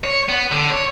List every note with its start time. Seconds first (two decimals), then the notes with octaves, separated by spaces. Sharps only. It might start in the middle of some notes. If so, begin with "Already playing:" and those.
0.04 C#5
0.29 B3
0.52 D3
0.70 C#5